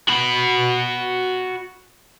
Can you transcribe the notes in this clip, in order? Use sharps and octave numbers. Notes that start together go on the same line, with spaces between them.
F#4 B5